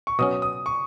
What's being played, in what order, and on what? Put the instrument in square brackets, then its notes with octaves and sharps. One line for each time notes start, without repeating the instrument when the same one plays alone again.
[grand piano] C#6
[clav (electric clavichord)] B2 F#3 C#4 [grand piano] D#6
[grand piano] D#6
C#6